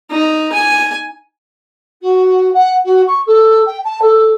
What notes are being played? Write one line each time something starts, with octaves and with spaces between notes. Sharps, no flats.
D#4
G#5
F#4
F#5
F#4
C#6
A4
G5
A5
A4